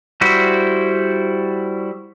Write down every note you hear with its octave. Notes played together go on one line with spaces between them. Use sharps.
G3 E4 F#4 C5